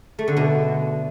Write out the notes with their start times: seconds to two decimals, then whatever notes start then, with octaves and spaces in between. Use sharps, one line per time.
0.19 A3
0.28 D3
0.37 B2